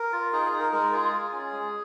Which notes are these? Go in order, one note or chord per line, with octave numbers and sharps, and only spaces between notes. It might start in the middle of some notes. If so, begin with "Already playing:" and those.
Already playing: A#4
F4
D#4 G#4
G#4
D#4
A#4
G#3 A#4
F4 G#4
F4
C#4
G#3